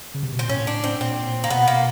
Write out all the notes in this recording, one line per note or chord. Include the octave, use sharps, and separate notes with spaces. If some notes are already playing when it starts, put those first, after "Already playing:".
C#3
C3
B2
A#2 C4
A2 C#4
D4
C4
A#2 C4
A#3
B2 B3
A#3